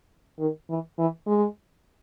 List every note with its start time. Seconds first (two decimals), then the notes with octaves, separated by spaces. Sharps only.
0.39 D#3
0.69 E3
0.98 E3
1.27 G#3